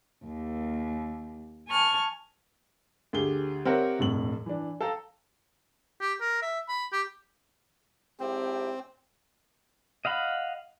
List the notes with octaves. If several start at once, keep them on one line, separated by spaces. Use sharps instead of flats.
D#2
G#5 A5 C#6 F6
D2 G4 G#4 G7
C4 G4 A#4 C#5 E5 F#5
E1 F2 A2 F#7
E3 D4
A4 F5 G5 A5 A#5
G4
A#4
E5
B5
G4
G#1 C4 E4 G4
D#5 F5 F#5 B5